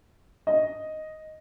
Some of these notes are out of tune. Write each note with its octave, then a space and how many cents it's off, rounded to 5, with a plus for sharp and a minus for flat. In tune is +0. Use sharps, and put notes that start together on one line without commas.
D#5 +0